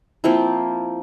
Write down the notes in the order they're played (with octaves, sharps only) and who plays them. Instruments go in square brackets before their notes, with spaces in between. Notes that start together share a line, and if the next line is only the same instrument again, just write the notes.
[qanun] F3 A#3 C4 E4